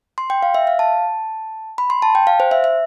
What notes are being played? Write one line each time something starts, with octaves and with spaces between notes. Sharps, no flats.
C6
G5
F5
E5
F5
A5
B5
C6
A5
G5
F5
C5
E5
E5